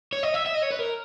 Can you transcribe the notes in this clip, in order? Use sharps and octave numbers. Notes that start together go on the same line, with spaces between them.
C#5
D#5
E5
E5
D#5
C#5
B4
A#4